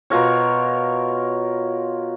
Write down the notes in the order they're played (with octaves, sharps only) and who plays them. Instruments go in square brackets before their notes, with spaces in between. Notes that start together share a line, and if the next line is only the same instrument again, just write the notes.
[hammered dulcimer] B2 F4 A#4 C#5